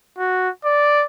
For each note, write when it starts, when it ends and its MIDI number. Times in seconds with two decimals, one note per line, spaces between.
0.18 0.49 66
0.65 1.05 74